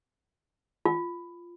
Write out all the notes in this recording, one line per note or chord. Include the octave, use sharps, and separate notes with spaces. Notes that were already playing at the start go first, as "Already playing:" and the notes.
F4